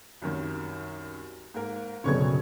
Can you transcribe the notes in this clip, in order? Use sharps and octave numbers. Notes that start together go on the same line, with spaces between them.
C2 F#2 D#3
G#2 A#3 A#4
F#1 B2 D3 C#5 C#6 G#6